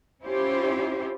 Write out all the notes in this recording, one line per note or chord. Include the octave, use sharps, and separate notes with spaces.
C#4 E4 F4 G4 C5